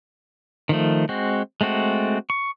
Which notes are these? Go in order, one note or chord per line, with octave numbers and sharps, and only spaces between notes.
D#3 F3 A3
G#3 C4 F#4
G#3 A3 C4 F#4
C#6